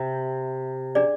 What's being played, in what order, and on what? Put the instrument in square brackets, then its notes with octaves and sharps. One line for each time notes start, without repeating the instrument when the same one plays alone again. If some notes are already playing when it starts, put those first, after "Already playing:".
Already playing: [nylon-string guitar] C3
[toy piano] D4 G#4 D5